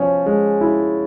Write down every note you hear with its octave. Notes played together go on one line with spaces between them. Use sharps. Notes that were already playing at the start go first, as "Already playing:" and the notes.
Already playing: F3 C#4
G#3
E4